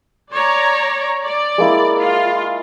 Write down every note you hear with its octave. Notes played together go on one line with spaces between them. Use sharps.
C#5 D5 A#5
D5
G#3 A#3 E4
F4